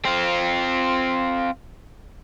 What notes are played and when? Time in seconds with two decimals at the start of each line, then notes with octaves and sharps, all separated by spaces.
0.05 C4 F4